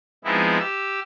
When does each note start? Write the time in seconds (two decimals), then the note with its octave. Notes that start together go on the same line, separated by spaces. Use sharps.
0.25 F3 G#3 B3 C4 D#4 E4
0.60 G4 E6